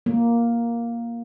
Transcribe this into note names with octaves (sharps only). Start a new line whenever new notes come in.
A#3